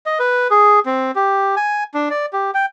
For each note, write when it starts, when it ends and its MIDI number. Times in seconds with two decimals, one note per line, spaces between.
0.06 0.19 75
0.19 0.48 71
0.51 0.80 68
0.86 1.11 60
1.15 1.55 67
1.56 1.84 80
1.94 2.09 62
2.10 2.26 74
2.33 2.51 67
2.54 2.66 79